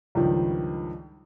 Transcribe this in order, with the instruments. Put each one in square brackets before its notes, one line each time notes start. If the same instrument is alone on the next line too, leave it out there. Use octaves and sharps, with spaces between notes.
[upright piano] C#2 G2 D#3 F3